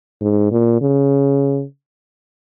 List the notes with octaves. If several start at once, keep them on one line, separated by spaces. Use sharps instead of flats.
G#2
A#2
C#3